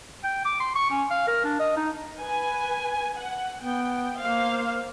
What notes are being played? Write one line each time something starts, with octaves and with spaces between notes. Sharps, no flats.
G5
D6
C6
C#6
C#4
F5
A#4
D4
D#5
D#4
B4 G#5
F#5
B3 G5
A#3 C5 F5